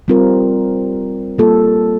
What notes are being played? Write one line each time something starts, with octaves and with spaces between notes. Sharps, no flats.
G3 C4 F4 A#4
G3 A#3 F4 A4